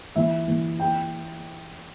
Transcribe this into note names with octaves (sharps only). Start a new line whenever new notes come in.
E3 E5
E3
G5